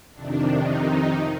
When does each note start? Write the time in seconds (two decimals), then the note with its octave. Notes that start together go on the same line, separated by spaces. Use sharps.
0.14 F2 C3 D#3 D4
0.66 D#4